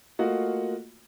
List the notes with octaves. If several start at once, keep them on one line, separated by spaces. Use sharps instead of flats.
A3 A#3 F4 F#4 D#5 F#5